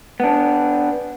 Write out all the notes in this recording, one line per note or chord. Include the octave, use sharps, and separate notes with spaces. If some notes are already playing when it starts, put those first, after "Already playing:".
B3 D4